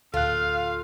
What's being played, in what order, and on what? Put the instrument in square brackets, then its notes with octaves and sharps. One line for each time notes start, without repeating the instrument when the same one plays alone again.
[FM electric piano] D2 A2 [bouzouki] F4 [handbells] A4 F#6 [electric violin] F5